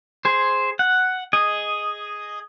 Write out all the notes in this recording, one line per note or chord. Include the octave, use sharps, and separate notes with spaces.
G#4 C5
F#5
G#4 D#5